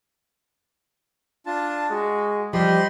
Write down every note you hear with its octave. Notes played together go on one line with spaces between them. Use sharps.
D4 F4 A5
G#3 F#4
F3 G3 G4 D#5 B5 C6